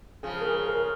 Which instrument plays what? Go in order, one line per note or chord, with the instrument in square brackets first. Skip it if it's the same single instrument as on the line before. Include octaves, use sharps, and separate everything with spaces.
[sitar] C#3 F3 [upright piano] G#4
[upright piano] A#4
G#4
A#4